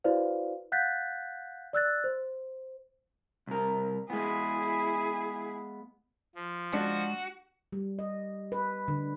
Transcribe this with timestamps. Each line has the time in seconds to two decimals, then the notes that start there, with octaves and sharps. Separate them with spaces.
0.04 E4 F#4 B4 C5 D5 F5
0.72 F5 F#5 F#6 G6 A6 B6
1.73 D5 E6 F#6 A6
2.04 C5
3.47 C2 A#4
4.10 G#3 B3 E4 G#4
6.35 F3
6.73 G#3 D4 F#4
7.72 G3
7.99 D#5
8.52 B4
8.88 D3